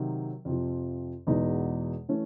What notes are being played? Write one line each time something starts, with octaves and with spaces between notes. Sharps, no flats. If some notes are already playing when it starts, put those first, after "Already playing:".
Already playing: C3 D#3 F#3
F2 C3 F3
E2 B2 G#3 B3 D#4
E3 A3 C#4